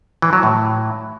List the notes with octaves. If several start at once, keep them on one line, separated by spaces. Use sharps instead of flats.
E3
F#3
A2